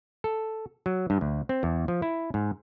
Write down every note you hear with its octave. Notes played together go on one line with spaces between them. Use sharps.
A4
F#3
G2
D2
C4
E2
F3
E4
G#2